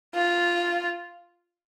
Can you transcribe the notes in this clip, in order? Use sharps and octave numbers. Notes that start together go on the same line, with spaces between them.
F4